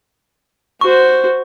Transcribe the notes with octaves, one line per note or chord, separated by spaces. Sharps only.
F#4 C5 C#6